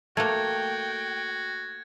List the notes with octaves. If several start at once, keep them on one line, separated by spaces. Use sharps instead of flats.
A3 A#3 F#4 G5 G#6